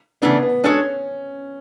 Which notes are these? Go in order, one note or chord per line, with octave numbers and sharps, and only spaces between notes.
C#3 E3 A3 B3 D4
B3
G#3 C#4 D4 F#4 A4 C#5